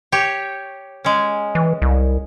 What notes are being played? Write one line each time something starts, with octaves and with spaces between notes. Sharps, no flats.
G4 C#5
G#3 C#4
E3
C2